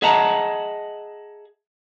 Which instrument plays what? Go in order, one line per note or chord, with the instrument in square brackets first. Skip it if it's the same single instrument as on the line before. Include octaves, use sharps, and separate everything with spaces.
[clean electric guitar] G#4 D#5 E5 F#5 A5 A#5